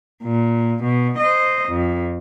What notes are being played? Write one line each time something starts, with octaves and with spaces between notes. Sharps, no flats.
A#2
B2
C5 D#5
F2